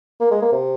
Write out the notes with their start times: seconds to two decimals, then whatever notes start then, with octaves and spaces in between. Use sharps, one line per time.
0.20 A#3
0.31 G#3
0.42 A#3
0.52 C3